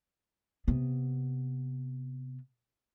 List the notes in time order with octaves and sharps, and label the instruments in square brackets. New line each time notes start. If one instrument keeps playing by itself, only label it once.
[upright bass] C3 B3